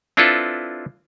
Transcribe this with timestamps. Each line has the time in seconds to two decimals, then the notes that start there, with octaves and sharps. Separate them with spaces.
0.17 C4 D4 E4 F4 A4 B4